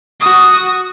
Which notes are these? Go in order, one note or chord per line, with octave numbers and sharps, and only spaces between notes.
F#4 D#6